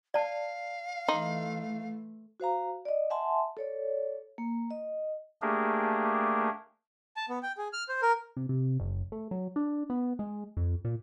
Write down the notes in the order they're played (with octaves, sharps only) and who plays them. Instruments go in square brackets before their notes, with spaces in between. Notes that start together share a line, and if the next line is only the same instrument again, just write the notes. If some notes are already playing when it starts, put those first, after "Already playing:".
[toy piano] D5 A5 [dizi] F5
[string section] E3 A3 [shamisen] D#4 [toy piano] C6
[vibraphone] F#4 C5 F5 A#5
D5 D#5
E5 F#5 G#5 A5 C6
A4 C#5 D5
A#3
D#5
[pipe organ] A3 A#3 D4 G4 G#4 A#4
[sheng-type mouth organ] A5
B3
G5
G#4
F6
C5
A#4
[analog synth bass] C3
C3
F#1
A3
F#3
D4
B3
G#3
F2
A#2